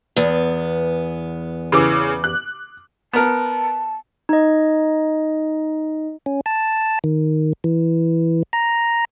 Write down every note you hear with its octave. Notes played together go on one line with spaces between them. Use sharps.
E2 B3
C#3 E3 D6
F#6
B3 A#4 A5
D#4 D#5
C#4
A5
D#3
E3
A#5